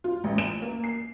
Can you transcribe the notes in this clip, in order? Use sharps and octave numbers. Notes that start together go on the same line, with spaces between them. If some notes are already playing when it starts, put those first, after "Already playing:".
F4
A1
E7
A#3
C7